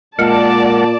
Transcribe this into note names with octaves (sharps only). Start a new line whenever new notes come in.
A#2 G#3 A#4 D5 F#5 A5